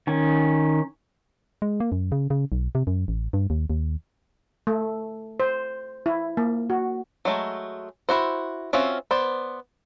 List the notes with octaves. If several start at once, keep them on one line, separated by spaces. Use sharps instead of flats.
D#3 C#4
G#3
A#3
F#2
C#3
C#3
B1
C3
F#2
A1
G2
D#2
D#2
A3
C5
E4
A#3
F#4
F#3 G#3 A3
E4 F#4 C5
C4 C#4 F4 F#4 E5
B3 C5 D5